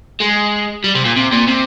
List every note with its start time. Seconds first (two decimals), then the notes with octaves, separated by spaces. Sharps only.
0.20 G#3
0.84 G3
0.95 C3
1.05 A#2
1.16 C3
1.32 A#2
1.47 C3